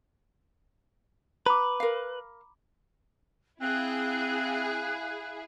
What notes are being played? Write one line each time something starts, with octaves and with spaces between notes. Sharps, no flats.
B4 A#5 B5 D6
A#4 F5
C4 E4 G#4 F5 F#6